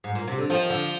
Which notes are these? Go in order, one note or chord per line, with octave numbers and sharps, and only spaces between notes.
G#2
A#2
C3
D3
D#3 F3
D3